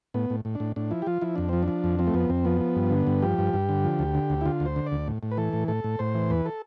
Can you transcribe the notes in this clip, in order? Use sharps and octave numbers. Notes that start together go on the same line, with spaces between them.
A2 B3
A2
A2
D4
A2
A2 D4
F3 E4
G4
F3 F4
F3 E4
F2 D4
F3 C4
D4
F3
F2
F3 C4
A3
F2 B3
F2 C4
F3 B3
F3
G2
D3
G2
F3 G4
G2
G2
D3
F3
D2
D3
D2
E4
D3 F4
D2
C5
D3
D5
D2
A2
A2
B4
E3 A4
A2
A2 A4
A2
A2 C5
E3
E2 B4
A4